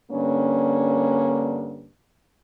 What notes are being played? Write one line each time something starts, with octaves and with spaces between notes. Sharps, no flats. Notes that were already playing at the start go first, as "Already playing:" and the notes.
G2 D3 A#3 C#4